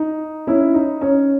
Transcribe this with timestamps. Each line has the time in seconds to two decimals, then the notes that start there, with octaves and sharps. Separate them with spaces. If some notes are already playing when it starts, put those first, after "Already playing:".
Already playing: D#4
0.47 C#4 E4
0.74 D#4
1.01 C#4